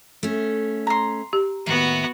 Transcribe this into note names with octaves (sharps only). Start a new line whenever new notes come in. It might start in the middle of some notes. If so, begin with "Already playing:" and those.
A3 C#4
A#5 C6
G4
D#2 A2 B3 F#4 E5